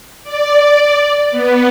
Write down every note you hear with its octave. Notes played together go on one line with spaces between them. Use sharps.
D5
B3